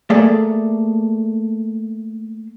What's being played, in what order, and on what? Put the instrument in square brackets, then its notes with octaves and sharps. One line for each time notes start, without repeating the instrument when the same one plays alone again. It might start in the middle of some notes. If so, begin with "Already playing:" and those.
[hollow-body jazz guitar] A3 A#3 G#4 A4 D5